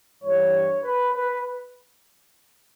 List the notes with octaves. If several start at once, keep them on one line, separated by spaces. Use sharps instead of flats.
G2 E3 G3 C#5
B4
B4